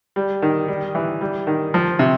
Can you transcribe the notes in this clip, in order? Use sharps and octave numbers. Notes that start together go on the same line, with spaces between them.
G3
D#3
G3
E3
G3
D#3
F3
C3